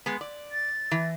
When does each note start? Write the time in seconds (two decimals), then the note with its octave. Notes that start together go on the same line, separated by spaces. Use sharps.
0.06 G#3 B3
0.21 D5
0.52 A6
0.91 E3